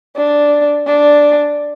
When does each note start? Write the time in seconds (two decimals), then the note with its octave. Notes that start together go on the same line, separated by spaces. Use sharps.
0.17 D4
0.86 D4